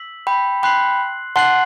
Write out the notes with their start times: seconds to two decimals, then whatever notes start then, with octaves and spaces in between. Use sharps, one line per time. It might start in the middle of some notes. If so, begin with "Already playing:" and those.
Already playing: E6 B6 F#7
0.27 G5 B5
0.63 G5 B5 C6 F#6 C7 F#7
1.36 F#5 A5 C6 F#6 C7 F#7